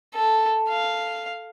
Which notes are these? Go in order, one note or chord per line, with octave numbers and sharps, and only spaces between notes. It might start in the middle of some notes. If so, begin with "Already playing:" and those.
A4
F5